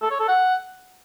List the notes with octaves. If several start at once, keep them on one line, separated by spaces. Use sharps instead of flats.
A4
C#5
A4
F#5